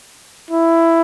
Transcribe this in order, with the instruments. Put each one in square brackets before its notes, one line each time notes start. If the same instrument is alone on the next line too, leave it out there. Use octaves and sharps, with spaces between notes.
[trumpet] E4